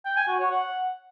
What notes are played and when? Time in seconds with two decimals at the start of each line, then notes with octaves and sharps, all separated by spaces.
0.05 G5
0.16 G#5
0.28 F#4
0.39 C#5
0.50 F#5